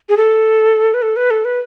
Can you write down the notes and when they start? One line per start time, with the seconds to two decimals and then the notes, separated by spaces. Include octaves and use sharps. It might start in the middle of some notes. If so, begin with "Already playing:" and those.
0.09 G#4
0.17 A4
0.94 B4
1.02 A4
1.16 B4
1.31 A4
1.45 B4